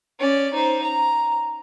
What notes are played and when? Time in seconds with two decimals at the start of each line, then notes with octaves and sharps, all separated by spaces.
0.19 C#4 D5
0.53 D#4 C5
0.83 A#5